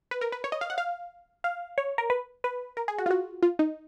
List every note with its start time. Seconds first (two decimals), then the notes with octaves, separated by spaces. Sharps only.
0.11 B4
0.21 A#4
0.32 B4
0.44 C#5
0.52 D#5
0.61 F5
0.70 F#5
0.78 F5
1.44 F5
1.78 C#5
1.98 A#4
2.10 B4
2.44 B4
2.77 A#4
2.88 G#4
2.98 F#4
3.06 F4
3.11 F#4
3.43 F4
3.59 D#4